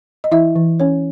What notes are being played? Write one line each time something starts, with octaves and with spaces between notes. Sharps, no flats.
D#5
E3 E4 E5
E3
C#4 C#5